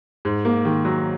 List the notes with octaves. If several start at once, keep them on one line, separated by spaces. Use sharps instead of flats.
G#2
A#3
D#3
F#3